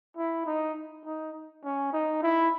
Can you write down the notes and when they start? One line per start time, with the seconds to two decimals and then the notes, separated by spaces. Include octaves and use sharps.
0.17 E4
0.46 D#4
1.05 D#4
1.64 C#4
1.93 D#4
2.23 E4